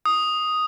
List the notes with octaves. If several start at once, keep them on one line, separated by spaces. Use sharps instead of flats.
D#6